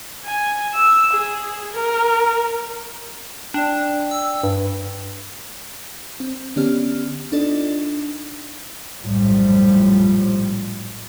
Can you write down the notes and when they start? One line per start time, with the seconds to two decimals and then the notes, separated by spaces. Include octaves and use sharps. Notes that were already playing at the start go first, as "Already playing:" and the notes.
0.25 G#5
0.74 E6
1.13 G#4
1.73 A#4
3.54 D4 D5 G5
4.11 E6
4.43 G2
6.20 C4
6.56 D3 B3 C#4 G4 D5 F6
7.32 D4 D#4 F4 A4 D5 D#5
9.03 A#1 F#2 A2 F3 G3